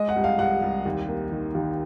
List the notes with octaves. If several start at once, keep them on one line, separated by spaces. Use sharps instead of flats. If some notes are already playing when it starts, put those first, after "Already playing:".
Already playing: G#3 D#5
F#5
C2
F5
C2 F#5
C2
D#2
A#3
D#3
D#2